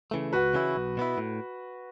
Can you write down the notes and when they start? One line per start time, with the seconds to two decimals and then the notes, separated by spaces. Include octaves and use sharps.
0.11 C#3 E3 A3
0.33 C#2 F#4 B4
0.54 C#3 E3 C#4 E4
0.76 B1
0.97 B2 B3 E4
1.18 A2